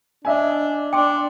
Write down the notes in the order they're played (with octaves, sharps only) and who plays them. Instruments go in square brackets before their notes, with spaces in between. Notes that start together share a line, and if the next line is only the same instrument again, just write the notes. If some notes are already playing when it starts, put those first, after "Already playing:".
[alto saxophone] D4 [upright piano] D#5 E5 G#5
[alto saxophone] D4 [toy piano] G5 C6 [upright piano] D6